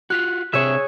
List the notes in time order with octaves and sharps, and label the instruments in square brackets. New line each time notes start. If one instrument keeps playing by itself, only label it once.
[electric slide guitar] F4 F#4 [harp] F#6 B6
[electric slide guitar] C3 C4 D4 [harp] G#4 C#5 C#6 [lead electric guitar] E5